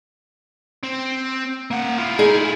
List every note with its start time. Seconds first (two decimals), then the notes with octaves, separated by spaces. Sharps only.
0.84 C4
1.71 A#3 F#5
1.98 E4 F4
2.19 D#4 G#4